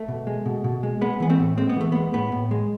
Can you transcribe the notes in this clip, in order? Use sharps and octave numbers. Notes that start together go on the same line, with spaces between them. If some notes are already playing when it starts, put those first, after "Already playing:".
Already playing: A3
B2
G#3
B2
B2
G#3
G#3 B3
E3 B3
A3 C4
A2
G#3 C4
B3
E3 A3
G#3 B3
A2 B3
A2
G#3